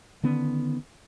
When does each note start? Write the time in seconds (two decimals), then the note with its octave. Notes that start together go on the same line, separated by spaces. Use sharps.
0.23 D3 D#3 B3 C#4